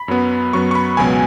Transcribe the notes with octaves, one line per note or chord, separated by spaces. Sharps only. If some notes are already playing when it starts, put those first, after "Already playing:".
Already playing: B5
F#2 F#3 B3
F#2 F#3 B3 C#6
C#6
B5
C#2 B2 F#3 B3 G#5